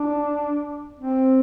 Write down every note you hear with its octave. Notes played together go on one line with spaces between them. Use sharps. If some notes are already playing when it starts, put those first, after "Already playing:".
Already playing: D4
C4